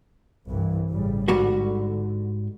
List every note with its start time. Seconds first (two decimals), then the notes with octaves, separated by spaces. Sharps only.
0.49 C2 G2 E3
0.91 A1 C#3 G3
1.28 G#2 D3 G3 F#4